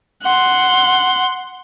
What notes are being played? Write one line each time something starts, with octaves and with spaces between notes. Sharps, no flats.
F#5 C6